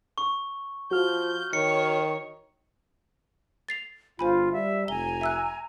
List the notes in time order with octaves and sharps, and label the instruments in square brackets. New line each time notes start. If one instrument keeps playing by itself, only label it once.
[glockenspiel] C#6
[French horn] F3 [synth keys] F#4 F6 [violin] G6
[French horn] D#3 [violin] C#5 [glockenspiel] C#7
[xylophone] A6 C7 F7
[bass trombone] G1 [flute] F4 [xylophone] C5 G#5 B5
[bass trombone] G3 [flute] E5
[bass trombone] F1 [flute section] G#5 [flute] A#5 [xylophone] G7
[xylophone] E5 E6 F#6